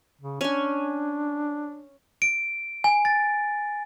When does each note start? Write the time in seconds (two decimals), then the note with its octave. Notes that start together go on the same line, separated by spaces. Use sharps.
0.21 C#3
0.41 C#4 D4 G#5
2.22 D7
2.84 G#5
3.05 A6